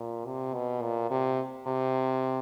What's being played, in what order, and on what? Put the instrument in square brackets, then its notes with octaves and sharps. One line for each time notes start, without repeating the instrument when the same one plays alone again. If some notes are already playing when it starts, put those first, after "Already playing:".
Already playing: [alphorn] A#2
C3
B2
A#2
C3
C3